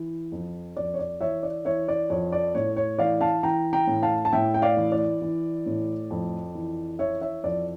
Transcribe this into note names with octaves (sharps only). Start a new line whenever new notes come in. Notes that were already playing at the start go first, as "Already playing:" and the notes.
Already playing: E3
F2
F2 D5
C#5
D5
E3 C#5 E5
D5
E3 C#5 E5
D5
F2 C#5
D5
A2 C#5
C#5
E3 D5 F5
F5 A5
E3 G5 A#5
G5 A#5
A2
F5 A5
A5
A2 E5 G5
G5
D5 F5
E3
D5
E3
A2
F2
E3
E3 C#5 E5
C#5 E5
F2 D5